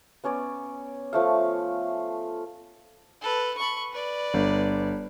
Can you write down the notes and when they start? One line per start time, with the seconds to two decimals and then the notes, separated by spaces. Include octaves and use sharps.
0.24 B3 C#4 C#5 D5
1.13 F3 A3 F5
3.21 A4 B4
3.58 B5 C#6
3.92 B4 D5
4.34 G1